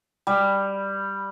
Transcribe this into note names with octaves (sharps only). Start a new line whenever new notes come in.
G3